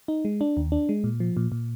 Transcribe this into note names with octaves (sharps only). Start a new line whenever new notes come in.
D#4
G#3
D4
D#2
D4
G#3
A#2
F3
A#2
A#2